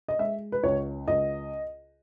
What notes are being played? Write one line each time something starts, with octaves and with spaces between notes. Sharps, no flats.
D#5
G#3 E5
B4
C#2 C#5
C#2 D#5